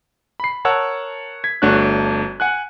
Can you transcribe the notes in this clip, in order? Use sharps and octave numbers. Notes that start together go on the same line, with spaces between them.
B5 C7
A#4 C#5 F#5 A5 E6
G#6 B6
G1 A3 D4 F#4 C#5 F#6
F#5 G#5 F#6